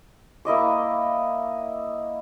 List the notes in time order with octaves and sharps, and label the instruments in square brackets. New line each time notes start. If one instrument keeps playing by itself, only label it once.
[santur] A#3 E4 D#5 D6